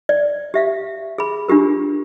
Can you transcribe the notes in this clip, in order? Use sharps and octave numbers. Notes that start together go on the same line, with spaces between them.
D5
G4 E5 F5
G#4 B5
D4 F4 G4 A#4